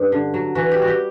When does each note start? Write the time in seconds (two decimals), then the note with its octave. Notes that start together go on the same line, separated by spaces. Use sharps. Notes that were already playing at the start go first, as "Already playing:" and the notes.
Already playing: G2
0.12 D3
0.34 F#3
0.55 E3 F#4
0.71 G4
0.77 G3 F#4
0.88 G4